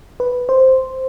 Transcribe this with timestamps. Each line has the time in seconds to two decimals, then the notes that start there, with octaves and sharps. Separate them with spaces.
0.20 B4
0.49 C5